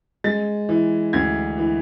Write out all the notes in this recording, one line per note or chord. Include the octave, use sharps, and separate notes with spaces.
G#3 A6
E3
D2 G#6
E3